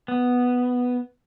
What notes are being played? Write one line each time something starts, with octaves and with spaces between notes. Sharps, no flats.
B3